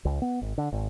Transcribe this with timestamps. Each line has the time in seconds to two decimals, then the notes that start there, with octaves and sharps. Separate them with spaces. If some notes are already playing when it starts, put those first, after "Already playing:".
0.05 C#2
0.22 B3
0.41 G#1
0.58 D3
0.72 G#1